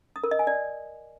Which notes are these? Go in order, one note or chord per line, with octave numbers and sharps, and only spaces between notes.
D#6
A#4
D#5
G#5
D5